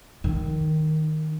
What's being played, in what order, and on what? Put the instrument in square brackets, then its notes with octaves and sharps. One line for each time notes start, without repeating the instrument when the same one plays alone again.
[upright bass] D#3